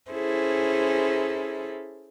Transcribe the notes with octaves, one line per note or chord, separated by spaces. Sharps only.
C#4 E4 G#4 A4 C5